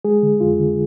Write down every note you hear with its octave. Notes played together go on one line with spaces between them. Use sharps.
G#3 G#4
D3
F2 F4
D3